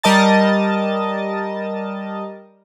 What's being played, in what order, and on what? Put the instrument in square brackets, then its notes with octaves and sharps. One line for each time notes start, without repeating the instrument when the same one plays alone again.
[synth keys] G3 A#4 D#5 A5 A6